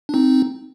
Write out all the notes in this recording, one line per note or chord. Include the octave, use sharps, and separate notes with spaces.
D4
C4 D#4